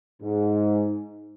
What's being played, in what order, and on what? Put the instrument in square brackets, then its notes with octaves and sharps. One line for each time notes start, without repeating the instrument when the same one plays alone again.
[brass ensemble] G#2